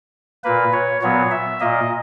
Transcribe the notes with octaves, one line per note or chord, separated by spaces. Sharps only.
A#2 A#3 B4
C#5
A#2 F#3 B3 C#5
E5
A#2 A#3 D#5